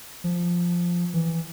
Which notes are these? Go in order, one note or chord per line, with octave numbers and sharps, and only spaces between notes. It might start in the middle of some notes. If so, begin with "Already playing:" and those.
F3
E3